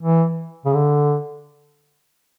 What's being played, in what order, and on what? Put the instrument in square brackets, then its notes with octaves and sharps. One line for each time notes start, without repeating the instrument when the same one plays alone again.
[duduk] E3
C#3
D3